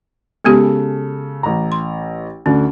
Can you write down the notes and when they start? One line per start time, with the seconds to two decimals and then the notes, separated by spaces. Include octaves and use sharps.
0.44 C#3 G#3 B3 G4 A4
1.43 A1 A#5
1.72 C6
2.46 D2 D3 C#4